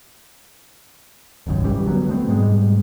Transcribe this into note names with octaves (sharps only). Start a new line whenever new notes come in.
D#1 G#1 C#2 F#2
B1 C#3 E3 G3
D3 F#3 A3 B3
A3 B3 C4
G#2 B2 G3 G#3